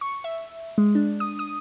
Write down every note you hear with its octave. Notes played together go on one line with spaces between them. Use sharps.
C#6
E5
G#3
D4
D#6
D#6